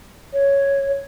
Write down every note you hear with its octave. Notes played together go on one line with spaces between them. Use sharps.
C#5